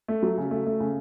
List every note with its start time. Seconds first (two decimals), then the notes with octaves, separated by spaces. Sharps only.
0.08 A3
0.22 F#3
0.38 C#3
0.51 A3
0.66 A3
0.80 C#3